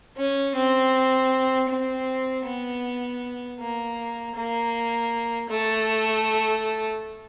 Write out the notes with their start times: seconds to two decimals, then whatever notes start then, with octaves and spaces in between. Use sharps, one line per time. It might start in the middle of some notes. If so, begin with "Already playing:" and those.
0.17 C#4
0.55 C4
1.69 C4
2.45 B3
3.60 A#3
4.36 A#3
5.50 A3